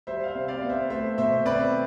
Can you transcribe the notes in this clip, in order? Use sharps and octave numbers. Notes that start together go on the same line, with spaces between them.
G3 C5 E5
F5
C5 E5
C3
D5 F5
B3
C5 E5
A3 C5 E5
B2 C5 E5
C4 B4 D5